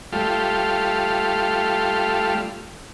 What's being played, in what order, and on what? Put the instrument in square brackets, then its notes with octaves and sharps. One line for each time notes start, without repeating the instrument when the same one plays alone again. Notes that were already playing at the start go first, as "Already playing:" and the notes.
[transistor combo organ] G3 A3 F4